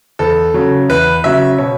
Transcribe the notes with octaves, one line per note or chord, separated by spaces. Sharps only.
E2 A4
C#3 F#3
E2 B4
C#3 F#3 E5
B2 C#5